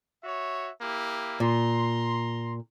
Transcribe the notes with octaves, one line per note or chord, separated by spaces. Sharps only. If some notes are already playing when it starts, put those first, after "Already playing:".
F#4 C#5 E5
A#3 E4 G4
A#2 A#5 C6